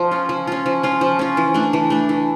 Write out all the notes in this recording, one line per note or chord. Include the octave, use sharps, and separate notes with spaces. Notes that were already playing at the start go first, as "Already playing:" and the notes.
Already playing: F3
C#4 F4
F3
C#4 F4
F3
C#4 F4
F3
C#4 F4
E3
A3 D4
E3
A3 D4
E3